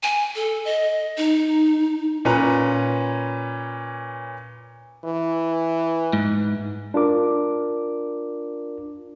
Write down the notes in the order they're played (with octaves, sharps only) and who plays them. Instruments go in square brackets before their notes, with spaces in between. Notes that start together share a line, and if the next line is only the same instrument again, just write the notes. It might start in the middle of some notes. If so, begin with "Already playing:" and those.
[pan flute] G#5
A4
D#5
D#4
[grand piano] A#2 C#4 B4 C#5 A#5
[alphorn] E3
[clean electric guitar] G#2
[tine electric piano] D4 F4 A#4 D6